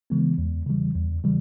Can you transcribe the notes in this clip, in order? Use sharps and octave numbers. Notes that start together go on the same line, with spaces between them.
C#3 E3 G#3 B3
E2
C#3 E3 G3
E2
C#3 E3 G3